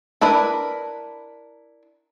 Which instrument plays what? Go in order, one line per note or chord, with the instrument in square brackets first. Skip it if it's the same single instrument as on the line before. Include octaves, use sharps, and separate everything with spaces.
[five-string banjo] D4 E4 A#4 B4